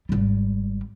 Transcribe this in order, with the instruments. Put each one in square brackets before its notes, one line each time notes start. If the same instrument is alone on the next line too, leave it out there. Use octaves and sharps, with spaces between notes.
[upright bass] G#1 G3